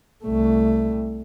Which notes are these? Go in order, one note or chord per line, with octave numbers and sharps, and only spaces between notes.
C2 A3